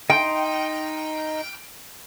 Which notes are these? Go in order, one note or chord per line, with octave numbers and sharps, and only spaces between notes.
D#4 G5 C6